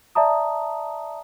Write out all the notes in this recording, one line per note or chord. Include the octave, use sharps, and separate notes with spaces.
D5 E5 A5 A#5 D#6